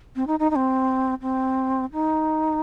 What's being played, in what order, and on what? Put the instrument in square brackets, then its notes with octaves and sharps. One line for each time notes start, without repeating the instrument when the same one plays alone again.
[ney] C4
D#4
D#4
D#4
C4
C4
D#4